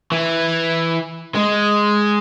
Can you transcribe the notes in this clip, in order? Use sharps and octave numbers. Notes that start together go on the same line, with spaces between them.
E3
G#3